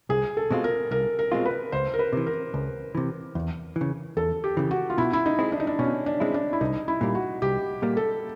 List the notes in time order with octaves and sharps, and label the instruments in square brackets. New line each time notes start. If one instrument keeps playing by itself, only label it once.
[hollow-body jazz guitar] C2 [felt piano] G#4
[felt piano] A4
[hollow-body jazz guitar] B2 G#3 C4 F4
[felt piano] A#4
[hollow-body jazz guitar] C2 [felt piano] A#4
[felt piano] A#4
[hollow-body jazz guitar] B2 G#3 C4 F4
[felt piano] B4
[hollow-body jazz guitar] C#2 [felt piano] C5
[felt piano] A#4
B4
[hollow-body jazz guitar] C3 E3
[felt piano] A#4
[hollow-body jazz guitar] C#2
C3 E3
E2
E3
C#3
[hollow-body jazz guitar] E2 [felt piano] A4
[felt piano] G4
[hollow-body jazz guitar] C#3 E3
[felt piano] F#4
F4
[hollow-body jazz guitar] B2 [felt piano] E4
[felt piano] E4
D#4
[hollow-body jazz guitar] G#3 C4 E4
[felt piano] D4
D#4
D4
[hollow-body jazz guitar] B2 [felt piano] C#4
[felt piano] D4
[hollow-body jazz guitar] G#3 C4 E4
[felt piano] D4
E4
[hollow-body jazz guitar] C2 [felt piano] D#4
[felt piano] E4
[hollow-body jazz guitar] A#2 G3 A#3
[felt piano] F#4
[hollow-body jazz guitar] C2 [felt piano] G4
[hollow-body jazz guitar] A#2 G3 A#3
[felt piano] A4